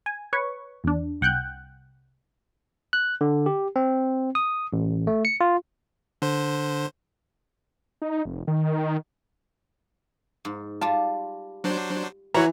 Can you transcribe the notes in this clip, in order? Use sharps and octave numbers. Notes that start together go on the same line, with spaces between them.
G#5
B4 C#5 C#6
E2 D4
C2 F#5 G5 F#6 G6
F#6
D3
G4
C4
D#6
A1
A3
C#7
F4
D3 C5
D#4
F1
D#3
G#2
G3 F4 A5
F#3 D4 C5
E3 E4 F#4 B4 C#5 A#5